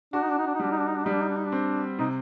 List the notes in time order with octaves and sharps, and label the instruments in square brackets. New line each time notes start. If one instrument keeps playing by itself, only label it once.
[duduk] D4 [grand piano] F#4
[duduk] D#4
D4
D#4
D4
D#4
[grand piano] G3 [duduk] D4
[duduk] D#4
D4
D#4
D4
[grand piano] G3 [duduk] D#4
[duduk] D4
D#4
D4
D#4
D4
[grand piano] C4
[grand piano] C3 [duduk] D#4